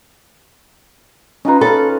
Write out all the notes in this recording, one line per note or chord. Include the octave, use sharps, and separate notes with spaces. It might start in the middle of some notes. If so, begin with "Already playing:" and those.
C#4 D#4 F4 B4 A#5
C#4 A4 F5 B5